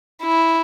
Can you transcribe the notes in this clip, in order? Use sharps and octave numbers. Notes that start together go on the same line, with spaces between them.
E4